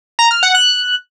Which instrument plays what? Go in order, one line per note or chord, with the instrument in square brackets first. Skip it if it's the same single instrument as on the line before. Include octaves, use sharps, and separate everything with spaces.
[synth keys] A#5
F6
F#5
F#6